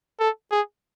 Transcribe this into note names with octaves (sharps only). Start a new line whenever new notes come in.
A4
G#4